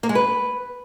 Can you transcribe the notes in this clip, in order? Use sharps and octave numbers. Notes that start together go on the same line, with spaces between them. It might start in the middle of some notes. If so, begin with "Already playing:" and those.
A#3
G#3
B4